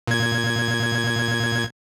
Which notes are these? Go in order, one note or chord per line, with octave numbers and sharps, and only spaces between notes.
A#2 G#6